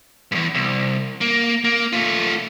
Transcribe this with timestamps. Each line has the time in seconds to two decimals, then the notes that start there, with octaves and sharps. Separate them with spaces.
0.32 E2 G2
0.55 C2
1.21 A#3
1.64 A#3
1.93 A3 F4